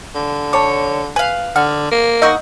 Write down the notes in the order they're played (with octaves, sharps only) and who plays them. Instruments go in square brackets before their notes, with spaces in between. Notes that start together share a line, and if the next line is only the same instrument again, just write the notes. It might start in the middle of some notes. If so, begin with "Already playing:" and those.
[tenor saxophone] D3
[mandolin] C#5 [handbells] A5 D6
[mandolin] B4 F5 [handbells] G#5
[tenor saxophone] D3 [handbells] F#5 [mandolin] F6
[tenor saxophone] A#3
[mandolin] D#4 F#5 C#6 [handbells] D#5 E6 G6